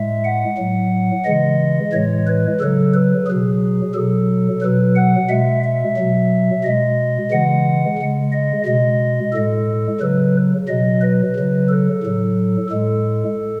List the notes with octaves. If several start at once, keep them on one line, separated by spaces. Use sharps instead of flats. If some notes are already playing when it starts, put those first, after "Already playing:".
Already playing: A2 G#3 E5
F#5
A2 F#3
C#3 E3 G#3 D#5
A2 E3 G#3 C#5
B4
C#3 F#3 A4
B4
B2 F#3 G#4
B2 F#3 A4
B2 F#3 B4
F#5
B2 G#3 E5
E5
B2 F#3
B2 G#3 D#5
C#3 E3 G#3 F#5
C#3 G#3
D#5
B2 G#3 D#5
A2 G#3 A4
C#3 F#3 B4
B2 F#3 D#5
B4
C#3 F#3
A4
A2 F#3
A2 G#3 A4